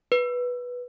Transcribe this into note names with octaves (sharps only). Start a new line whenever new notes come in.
B4